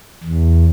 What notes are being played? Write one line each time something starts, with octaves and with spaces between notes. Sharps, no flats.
E2